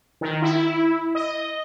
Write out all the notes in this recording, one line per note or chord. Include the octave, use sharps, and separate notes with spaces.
D#3
E4
D#5